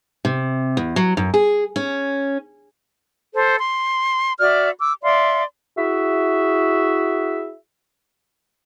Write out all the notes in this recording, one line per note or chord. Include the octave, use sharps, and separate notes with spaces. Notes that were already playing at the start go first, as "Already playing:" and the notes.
C3
E2
F#3
F#2
G#4
C#4
A4 C5
C6
F#4 D5 E5 F6
D6 E6
D5 E5 F5 C6
E4 F#4 G#4 E5